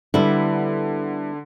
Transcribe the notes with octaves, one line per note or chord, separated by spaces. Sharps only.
D3 G3 B3 E4